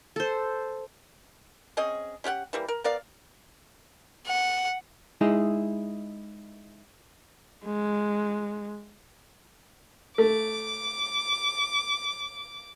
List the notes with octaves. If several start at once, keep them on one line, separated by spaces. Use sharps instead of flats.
A4 C5
C4 C#4 G#4 D#5
C#4 G4 F5 F#5
E3 G3 A#3
A#4
B3 A#4 D5 F5
F#5
G#3 D#4 E4 G#4
G#3
A3 D6